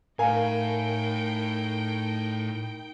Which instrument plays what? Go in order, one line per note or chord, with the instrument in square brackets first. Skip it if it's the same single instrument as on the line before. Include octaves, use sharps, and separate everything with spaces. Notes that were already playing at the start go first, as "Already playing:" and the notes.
[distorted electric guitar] A2 [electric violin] D#4 G5 [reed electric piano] A#4 [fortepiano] F5 G#5